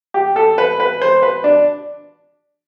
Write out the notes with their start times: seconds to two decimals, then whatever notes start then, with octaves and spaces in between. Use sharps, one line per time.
0.14 G4
0.36 A4
0.58 B4
0.80 B4
1.02 C5
1.22 B4
1.44 D4